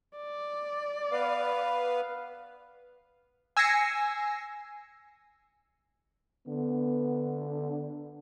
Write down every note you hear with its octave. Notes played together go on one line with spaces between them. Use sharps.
D5
B3 B4 F5
G#5 E6 G#6 A#6 C7 C#7
D3 B3